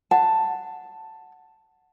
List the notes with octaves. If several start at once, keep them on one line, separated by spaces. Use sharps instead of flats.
F#5 A5